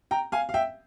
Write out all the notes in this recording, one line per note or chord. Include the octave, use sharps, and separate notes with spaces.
G5 A#5
F5 G#5
F5
E5 G5